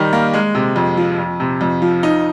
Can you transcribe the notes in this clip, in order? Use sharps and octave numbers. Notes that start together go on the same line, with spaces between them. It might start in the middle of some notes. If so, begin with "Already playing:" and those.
Already playing: D#3 G3 D#4
A#3
G#3
C3
F2
F3
F2
C3
F2
F3
D#4